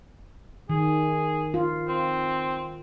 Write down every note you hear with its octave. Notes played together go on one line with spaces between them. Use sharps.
D#3 G#4
F4
C4